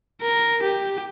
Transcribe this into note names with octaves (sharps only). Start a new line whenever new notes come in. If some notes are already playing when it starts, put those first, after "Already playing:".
A#4
G4